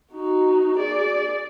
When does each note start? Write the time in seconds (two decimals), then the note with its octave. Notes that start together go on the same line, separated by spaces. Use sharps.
0.13 D#4 F#4
0.78 G#4 D5